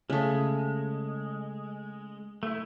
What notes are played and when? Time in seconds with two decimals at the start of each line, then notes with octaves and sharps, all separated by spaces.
0.10 C#3 G#3 A3
2.43 A3 E4